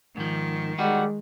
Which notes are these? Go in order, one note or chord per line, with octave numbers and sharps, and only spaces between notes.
G#2 D#3 F3
G3 G#3 D#4 F#4 F#5